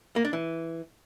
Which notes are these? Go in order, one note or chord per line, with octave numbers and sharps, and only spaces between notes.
A#3
D4
E3